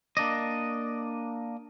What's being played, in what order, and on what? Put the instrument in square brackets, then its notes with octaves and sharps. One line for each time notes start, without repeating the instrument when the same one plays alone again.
[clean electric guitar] A#3 D4 D5 D#5